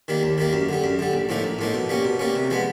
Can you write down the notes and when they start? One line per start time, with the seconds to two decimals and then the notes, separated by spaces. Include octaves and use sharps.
0.08 D#3 G3 A#3
0.23 D#2
0.38 D#3 G3 A#3
0.53 F#2
0.69 D3 G3
0.84 F#2
0.99 D3 G3
1.13 A#1
1.29 A2 F3 A#3 D#4
1.44 A#1
1.59 A2 F3 A#3 D#4
1.74 B2
1.89 G3 A#3 C#4
2.05 B2
2.19 G3 A#3 C#4
2.35 C3
2.50 F3 G#3 B3